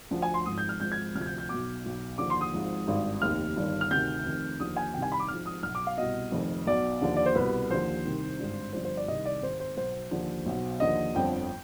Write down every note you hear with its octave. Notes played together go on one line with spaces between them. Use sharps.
D2 D3 F3
G#5
C6
G#1 G#2 F3 D#6
G6
F6
G#1 G#2 F3 G6
G#6
D2 C3 F3 F6
G#6
G6
G6
B1 B2 D6
B1 B2
D#2 D3 F3 D6
C6
D#6
G#1 G#2 F3
G#1 G2 D#3
F1 D#2 D#3 F6
G1 G2 D#3
F6
D2 C3 D#3 G6
F1 F2 D#3
D#2 D3 F3 D#6
G#5
C2 C3 D#3 G5
G#5
B5
D6
G#1 G#2 F3 F6
D#6
B1 B2 F6
D6
F5
C2 B2 D#5
F1 F2 D#3
B1 B2 D5
D#2 D3 F3
D5
C5
C2 B2 B4
D#2 D3 F3 C5
C2 C3 D#3
G#1 G2 D3
G1 G2 D3 F3 C5
C5
D5
C2 C3 D#3 D#5
D5
G#1 G#2 D#3 C5
C5
B1 B2 C5
D#2 D3 F3
B1 B2
D#2 D3 F3 D#5
G1 F2 D3 F3 G5